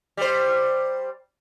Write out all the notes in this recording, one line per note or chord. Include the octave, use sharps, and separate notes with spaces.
G3 C5